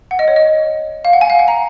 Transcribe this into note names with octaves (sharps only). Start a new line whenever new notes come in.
F#5
D#5
C#5
D#5
F5
F#5
G#5
F5
F#5
A#5